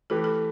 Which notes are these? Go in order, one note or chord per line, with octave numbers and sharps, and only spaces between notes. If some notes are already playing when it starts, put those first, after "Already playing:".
E3 A3 G4 A4 B4
A4